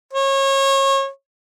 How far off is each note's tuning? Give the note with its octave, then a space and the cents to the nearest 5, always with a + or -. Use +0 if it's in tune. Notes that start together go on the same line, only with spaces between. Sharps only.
C#5 -30